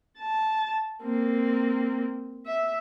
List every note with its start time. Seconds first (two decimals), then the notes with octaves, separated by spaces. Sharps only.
0.19 A5
1.03 A#3 C4
2.46 E5